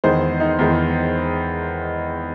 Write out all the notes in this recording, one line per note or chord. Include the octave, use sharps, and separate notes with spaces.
E2 D#3 G#3 C5
D#4
E2 D#3 G#3